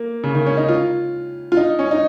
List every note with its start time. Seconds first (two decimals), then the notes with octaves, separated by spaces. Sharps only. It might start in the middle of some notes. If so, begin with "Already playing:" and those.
Already playing: A#3
0.24 C#3
0.35 D#3
0.46 C#4
0.57 D#4
0.69 F4
1.52 F4
1.57 D#4
1.79 C#4
1.91 D#4